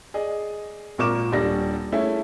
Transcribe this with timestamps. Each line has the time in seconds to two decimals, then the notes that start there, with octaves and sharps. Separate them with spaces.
0.14 G#4 D5 D#5
0.98 G#1 A#2 A#4 C#6 D6 E7
1.32 D#1 G3 D4 D5 A#6
1.92 A3 C#4 E4 G#4